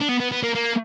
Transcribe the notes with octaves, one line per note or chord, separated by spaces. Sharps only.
D4
B3
B3
B3
A#3
A#3